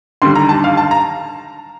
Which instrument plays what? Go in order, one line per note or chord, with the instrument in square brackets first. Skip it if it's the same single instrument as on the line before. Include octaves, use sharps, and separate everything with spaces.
[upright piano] D#2 D3 G3 C6
A#5
A5
F5
A5
A#5